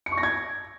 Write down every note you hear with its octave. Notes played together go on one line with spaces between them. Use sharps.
C#7
C#6
A#6
G#6